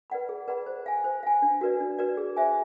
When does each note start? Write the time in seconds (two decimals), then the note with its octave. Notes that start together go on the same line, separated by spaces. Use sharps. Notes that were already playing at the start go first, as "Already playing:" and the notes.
0.10 B4 D5 F#5 B5
0.29 G#4
0.48 B4 D5 F#5 B5
0.66 C5
0.86 F5 G#5
1.04 C5
1.23 F5 G#5
1.42 D4
1.61 F#4 B4 D5
1.80 D4
1.99 F#4 B4 D5
2.17 G#4
2.36 C5 E5 G#5